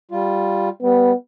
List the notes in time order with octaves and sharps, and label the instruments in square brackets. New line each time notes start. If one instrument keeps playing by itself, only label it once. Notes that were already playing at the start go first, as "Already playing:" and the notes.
[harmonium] G3 F4
[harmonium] G3 [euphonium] B3